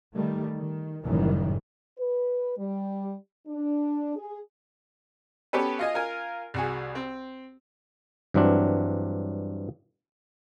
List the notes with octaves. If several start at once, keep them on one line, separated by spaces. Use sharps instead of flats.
D#3 G3 A3
D#3
F#1 F#2 A2 D#3 E3 G3
B4
G3
D4
G#4
B3 C#4 G4 A4 B4
F4 D#5 G#5
F4 A#4 G#5
C2 F#4 G#4
C4
G2 E3 F#3 C4 D4